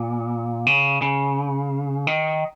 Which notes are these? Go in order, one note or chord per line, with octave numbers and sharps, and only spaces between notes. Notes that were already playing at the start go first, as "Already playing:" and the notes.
Already playing: A#2
C#3
C#3
D#3